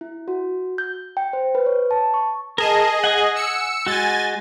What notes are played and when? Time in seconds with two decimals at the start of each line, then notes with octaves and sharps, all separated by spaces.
0.01 E4
0.28 F#4
0.78 G6
1.17 G5
1.33 C5
1.55 B4
1.66 C#5
1.91 A5
2.14 C#6
2.58 G#4 A#4 D#5 A5
3.04 F#5 G#5 D#6
3.35 E6 C#7
3.87 G#3 F#4 G#5 A6